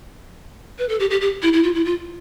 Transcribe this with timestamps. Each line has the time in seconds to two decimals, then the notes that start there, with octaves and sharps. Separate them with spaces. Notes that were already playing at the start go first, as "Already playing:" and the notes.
0.79 B4
0.89 A4
1.00 G4
1.10 G4
1.21 G4
1.42 E4
1.53 E4
1.63 F4
1.75 E4
1.85 F4